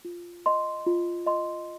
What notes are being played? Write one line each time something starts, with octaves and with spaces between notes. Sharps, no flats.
F4
D#5 C6
F4
D#5 C6